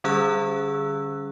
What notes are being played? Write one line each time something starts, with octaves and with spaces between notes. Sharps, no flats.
D3 G3 C#4 G#4 E6 F#6